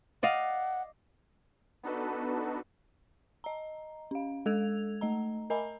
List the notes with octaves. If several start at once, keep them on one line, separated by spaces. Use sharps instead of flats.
D5 D#5 F5 F#5
B3 D4 D#4 F#4 A4 B4
D#5 A#5
C#4 F5
G#3 A4 E6 G#6 F7
A3 D#5 A#5
A#4 D#5 G#5 A#5 B5